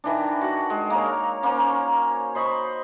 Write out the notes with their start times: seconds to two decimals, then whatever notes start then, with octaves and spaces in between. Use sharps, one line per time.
0.04 D#3 E3 D4
0.41 F#4 F#5
0.70 G#3
0.90 A#3 A#4 C#5
1.43 A#3 C#4 C5 C#5
2.35 C5 D#5 B5 C#6